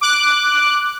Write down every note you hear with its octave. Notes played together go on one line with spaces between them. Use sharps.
D6 F#6